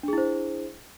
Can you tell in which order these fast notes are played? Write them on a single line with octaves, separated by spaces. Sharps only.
D4 G#4 E4 C5